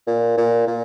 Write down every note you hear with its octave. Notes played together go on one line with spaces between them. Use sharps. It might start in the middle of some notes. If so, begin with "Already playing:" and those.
A#2
A#2
A#2